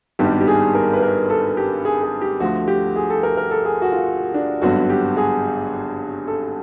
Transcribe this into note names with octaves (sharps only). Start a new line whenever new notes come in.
G#1 G2 D#3 G3 B3 G4
G4
G#4
A#4
B4
A#4
A4
G4
G#4
G#4
G4
D2 D3 F3 A3 F#4
G4
G#4
A4
A#4
A#4
A4
G#4
F#4
F4
D4
G#1 G2 D3 F#3 B3 F#4
G4
G#4
A4